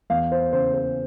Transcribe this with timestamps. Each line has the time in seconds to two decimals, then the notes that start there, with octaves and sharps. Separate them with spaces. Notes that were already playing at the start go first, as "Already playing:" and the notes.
0.10 E2 F5
0.32 C5
0.53 C#3 C5
0.74 C5